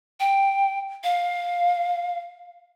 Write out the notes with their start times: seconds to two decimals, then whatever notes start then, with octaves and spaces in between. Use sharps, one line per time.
0.20 G5
1.04 F5